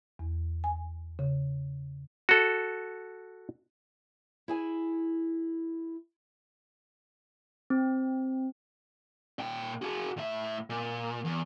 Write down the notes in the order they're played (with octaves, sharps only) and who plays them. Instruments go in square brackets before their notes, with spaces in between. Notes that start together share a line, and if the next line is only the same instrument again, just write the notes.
[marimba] E2
G#5
C#3
[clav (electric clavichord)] F#4 A4
[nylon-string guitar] E4 G#4 G#5
[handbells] C4
[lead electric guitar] A#2 G5
F#4 G#4
A2 E5
A#2
E2